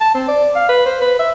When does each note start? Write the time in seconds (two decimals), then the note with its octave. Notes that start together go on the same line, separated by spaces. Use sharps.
0.01 A5
0.15 C4
0.28 D5
0.56 F5
0.69 B4
0.86 C5
1.01 B4
1.19 E5